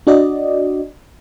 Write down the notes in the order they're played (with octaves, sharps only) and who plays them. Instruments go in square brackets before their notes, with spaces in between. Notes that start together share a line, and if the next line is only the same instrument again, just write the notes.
[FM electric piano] D4 F#4 D5 D#5